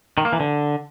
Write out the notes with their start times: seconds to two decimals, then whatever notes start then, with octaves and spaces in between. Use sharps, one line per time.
0.18 D#3
0.25 A#3
0.33 E3
0.40 D3